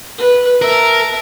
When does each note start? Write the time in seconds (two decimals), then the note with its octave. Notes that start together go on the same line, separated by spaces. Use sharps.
0.18 B4
0.62 A#4 E5 A5